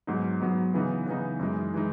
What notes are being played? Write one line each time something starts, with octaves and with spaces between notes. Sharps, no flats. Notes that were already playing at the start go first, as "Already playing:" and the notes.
G#2 F#3 B3 D#4
G#2 F#3 B3 D#4
C#3 E3 B3 D#4
C#3 E3 B3 D#4
F#2 E3 G#3 D#4
E3 G#3 D#4